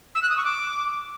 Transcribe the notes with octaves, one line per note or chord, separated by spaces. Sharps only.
E6
F#6
D#6
C#6
D6